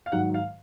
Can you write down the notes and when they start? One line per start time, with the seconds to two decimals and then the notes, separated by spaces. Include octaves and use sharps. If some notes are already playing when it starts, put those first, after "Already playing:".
0.06 F5
0.12 G#2 D#3 F#3 F#5
0.34 F5